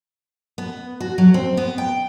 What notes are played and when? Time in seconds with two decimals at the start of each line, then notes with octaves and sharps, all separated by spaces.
0.58 B3
1.00 F#4
1.18 F#3
1.34 C4
1.57 B3
1.78 G5